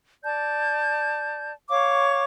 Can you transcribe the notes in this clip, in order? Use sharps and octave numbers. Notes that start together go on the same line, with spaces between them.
D5 A5 G6
C#5 F5 C#6 D6